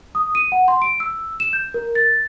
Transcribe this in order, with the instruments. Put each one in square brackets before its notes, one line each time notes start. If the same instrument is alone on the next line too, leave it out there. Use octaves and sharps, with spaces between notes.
[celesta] D#6
D#7
F#5
C6
D7
E6
E7
G6
A#4
A6